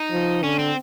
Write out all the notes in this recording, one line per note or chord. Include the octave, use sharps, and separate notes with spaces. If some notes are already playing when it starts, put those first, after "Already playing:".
Already playing: D#4
F3
D3 C#4
C4